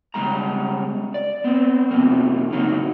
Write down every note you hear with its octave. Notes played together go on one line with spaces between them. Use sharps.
C#3 G3 G#3 A#5
D5
B3 C4
F2 C3 A#3
A2 C#3 F#3 A#3 D#4 F#4